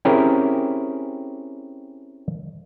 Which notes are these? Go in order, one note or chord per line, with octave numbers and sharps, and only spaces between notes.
C4 C#4 E4 G4 G#4 A#4